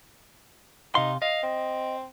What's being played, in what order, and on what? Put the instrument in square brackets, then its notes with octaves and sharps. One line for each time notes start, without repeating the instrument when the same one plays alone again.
[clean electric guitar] C3 F5 C6 [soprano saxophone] D#4
[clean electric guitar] D#5 [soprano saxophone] F5
[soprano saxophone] C4